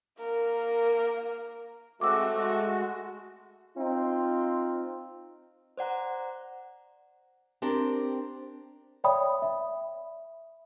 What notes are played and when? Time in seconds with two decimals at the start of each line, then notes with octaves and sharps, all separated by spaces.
0.19 A#3 A#4
2.01 G#3 A3 C4 F#4 D6 E6
2.37 G#3 F#4
3.77 C4 D#4 F4
5.77 C5 D5 F#5 A#5
7.62 C4 D4 G4 A#4
9.04 C#5 D5 E5 G5 B5 D#6
9.42 E5